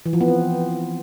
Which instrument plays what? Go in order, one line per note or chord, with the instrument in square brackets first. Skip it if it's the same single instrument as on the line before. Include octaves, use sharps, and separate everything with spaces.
[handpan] E3
F3
B3
C4